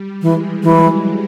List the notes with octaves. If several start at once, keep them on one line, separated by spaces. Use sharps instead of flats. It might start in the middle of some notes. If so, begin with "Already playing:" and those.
Already playing: G3
E3 G#3
E3 F#3